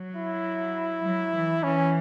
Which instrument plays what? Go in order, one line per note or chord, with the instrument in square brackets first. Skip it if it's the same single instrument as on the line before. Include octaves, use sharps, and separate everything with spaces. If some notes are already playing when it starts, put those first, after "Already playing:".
Already playing: [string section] F#3
[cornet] E4
[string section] F#3
E3
[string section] E3 [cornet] C#4